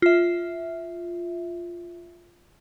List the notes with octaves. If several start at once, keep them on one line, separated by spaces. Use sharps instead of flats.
F4 E5